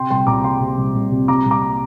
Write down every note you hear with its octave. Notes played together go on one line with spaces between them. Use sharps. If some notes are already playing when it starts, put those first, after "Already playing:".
Already playing: C3 G5 C6
C2 G5 C6
C2 A#5 D6
C3 G5 C6
C3
C2
C2
C3
C3 A#5 D6
C2
A#5 D6